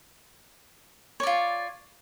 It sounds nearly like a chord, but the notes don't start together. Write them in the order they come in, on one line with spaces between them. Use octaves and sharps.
C#5 D5 F4